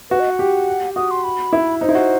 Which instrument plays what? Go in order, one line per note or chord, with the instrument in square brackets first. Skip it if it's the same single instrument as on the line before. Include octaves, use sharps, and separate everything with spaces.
[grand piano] F#4 [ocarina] B4
[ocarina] D#5
F#5
[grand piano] G4
[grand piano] F#4 [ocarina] D#6
[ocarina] C6
B5
[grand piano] E4
[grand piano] D#4 [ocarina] C5
[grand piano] E4
F#4